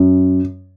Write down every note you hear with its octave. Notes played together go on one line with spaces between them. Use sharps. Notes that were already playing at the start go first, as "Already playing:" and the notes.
Already playing: F#2